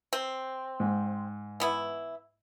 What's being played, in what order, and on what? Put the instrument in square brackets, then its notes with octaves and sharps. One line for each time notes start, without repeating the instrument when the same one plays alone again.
[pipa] C4
[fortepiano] G#2
[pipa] E3 B3 E4